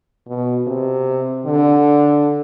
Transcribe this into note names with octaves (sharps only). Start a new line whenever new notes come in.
B2
C3
D3